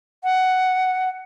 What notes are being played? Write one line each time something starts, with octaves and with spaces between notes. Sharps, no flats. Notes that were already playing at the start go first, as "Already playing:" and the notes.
F#5